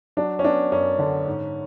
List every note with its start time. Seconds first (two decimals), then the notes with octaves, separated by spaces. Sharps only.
0.17 F#3 D4
0.39 C#4
0.44 B3 D4
0.72 F#2 C#4
0.99 D3
1.26 G#2